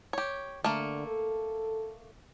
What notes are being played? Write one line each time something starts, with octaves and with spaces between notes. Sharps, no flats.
G4 C#5
D3 A3 A#3
A4